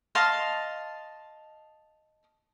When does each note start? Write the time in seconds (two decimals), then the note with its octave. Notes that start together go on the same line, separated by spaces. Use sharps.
0.15 D#5 F5 A5 C6